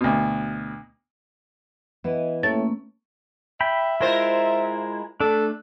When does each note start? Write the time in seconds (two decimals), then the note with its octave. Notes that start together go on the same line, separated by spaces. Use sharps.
0.01 D2 B2
2.04 E3 B3 D#5 E5
2.43 A2 A3 A#3 C#4 A4 A6
3.61 E5 G5 B5
4.01 G#3 E4 F4 A#4 C5
5.20 A3 D4 A4